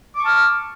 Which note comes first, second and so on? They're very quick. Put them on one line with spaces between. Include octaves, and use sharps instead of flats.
D6 C#6 A5 F6